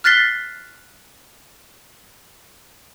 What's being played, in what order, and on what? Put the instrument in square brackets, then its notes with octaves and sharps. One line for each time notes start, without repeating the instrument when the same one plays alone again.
[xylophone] F6 F#6 A6 B6 C7 G7